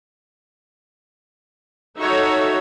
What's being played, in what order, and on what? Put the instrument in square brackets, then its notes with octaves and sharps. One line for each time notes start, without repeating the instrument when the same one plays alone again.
[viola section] D#4 F#4 A4 C#5 E5